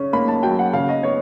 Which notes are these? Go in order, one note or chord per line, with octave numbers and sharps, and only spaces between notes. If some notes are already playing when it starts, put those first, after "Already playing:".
Already playing: C#3 C#4
A#3 B5
A5
F#3 G5
F#5
C#3 F5
D#5
B3 C#5